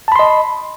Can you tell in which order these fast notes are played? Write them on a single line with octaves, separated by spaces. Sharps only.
A5 B5 C6 D#5